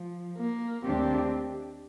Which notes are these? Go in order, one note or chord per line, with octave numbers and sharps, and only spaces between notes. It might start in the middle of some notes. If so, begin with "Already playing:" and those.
Already playing: F3
A#3
D#2 D#3 A3 C4 D4 G4